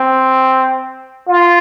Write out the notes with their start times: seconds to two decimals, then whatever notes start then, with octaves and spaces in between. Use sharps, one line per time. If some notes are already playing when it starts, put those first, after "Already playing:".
Already playing: C4
1.27 F4